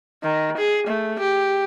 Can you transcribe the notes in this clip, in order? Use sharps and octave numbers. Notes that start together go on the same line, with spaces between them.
D#3
G#4
A3
G4